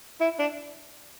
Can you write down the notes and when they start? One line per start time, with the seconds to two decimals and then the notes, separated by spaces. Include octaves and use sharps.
0.21 E4
0.40 D4